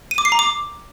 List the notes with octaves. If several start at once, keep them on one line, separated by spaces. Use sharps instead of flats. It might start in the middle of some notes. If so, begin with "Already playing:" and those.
D#7
D6
C7
A#5
D6